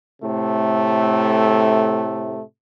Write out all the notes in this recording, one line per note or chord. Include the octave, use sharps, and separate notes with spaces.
A2 C3 A3